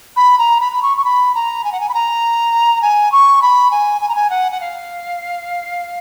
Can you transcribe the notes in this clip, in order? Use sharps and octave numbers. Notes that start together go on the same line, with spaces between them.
B5
A#5
B5
B5
C#6
C#6
B5
A#5
G#5
F#5
G#5
B5
A#5
G#5
C#6
B5
G#5
G#5
A#5
G#5
F#5
F#5
F5